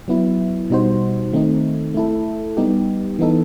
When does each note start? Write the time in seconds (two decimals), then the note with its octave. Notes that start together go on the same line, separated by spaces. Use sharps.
0.08 F#3 B3 E4
0.70 B2 G3 D#4 F#4 C5
1.33 D#3 A3 C4 D#4
1.94 A3 E4 A4
2.57 G3 B3 D#4 G4
3.19 E3 B3 D#4 A4